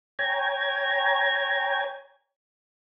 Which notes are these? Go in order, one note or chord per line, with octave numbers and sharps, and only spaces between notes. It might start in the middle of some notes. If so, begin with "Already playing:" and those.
C#5 G5 G#5 A#5 G#6